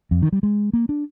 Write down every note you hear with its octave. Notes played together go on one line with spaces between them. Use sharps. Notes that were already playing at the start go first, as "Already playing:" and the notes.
F2
D#3
G3
G#3
A#3
D4